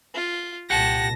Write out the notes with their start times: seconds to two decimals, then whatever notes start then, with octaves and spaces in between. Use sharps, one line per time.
0.14 F4
0.70 C2 A#2 G4 F#5 A5 A#6